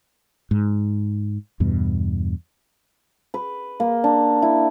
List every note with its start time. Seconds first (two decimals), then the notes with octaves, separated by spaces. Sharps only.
0.51 G#2
1.60 E2 G2 B2
3.34 B4
3.80 A#3
4.04 D4
4.42 E4